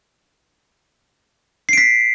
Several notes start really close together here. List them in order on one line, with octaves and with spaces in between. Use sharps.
C7 D7 B6